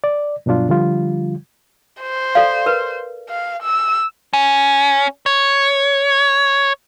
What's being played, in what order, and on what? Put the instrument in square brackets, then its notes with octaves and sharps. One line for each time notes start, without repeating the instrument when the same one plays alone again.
[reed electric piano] D5
G2 B2 F#3 D4 F4
D3 F3 G3 F4
[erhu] C5
[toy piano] A4 D5 F5
A#4 B4
[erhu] F5
E6
[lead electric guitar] C#4
C#5